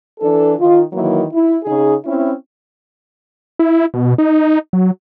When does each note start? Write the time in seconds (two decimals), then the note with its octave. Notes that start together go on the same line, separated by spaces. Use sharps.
0.20 E3 D4 A4
0.58 D#3 D#4 F4
0.92 D#3 E3 F#3 A#3 E4
1.33 E4
1.63 C#3 D#4 G#4
2.05 C4 C#4 E4
3.59 E4
3.94 B2
4.18 D#4
4.73 F#3